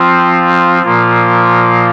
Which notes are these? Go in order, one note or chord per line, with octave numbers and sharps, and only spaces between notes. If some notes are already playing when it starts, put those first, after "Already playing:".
Already playing: F3 C4 F4
A#2 F3 A#3 F4